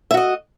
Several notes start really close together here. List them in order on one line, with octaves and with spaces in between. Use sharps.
E5 F#4 D#5